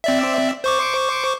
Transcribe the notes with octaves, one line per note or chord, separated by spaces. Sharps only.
C4 D5 E5
C5 C#6 D6